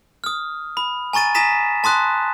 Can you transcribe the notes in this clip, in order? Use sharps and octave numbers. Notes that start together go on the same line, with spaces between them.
D#6 F6
B5
G#5 A#5 C#6 A6 D#7
G#5 A#5 D#6 A#6 B6 E7
A5 C6 D#6 F#6